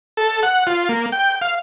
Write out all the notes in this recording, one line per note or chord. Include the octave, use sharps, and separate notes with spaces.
A4
F#5
F4
A#3
G5
F5